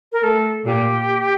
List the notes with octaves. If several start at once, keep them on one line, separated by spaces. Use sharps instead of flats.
A#4
A3 A4
A#2 G4